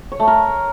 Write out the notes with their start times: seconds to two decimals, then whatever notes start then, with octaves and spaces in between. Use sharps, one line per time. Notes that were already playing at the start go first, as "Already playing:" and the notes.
0.12 C#5
0.20 A3
0.28 A#4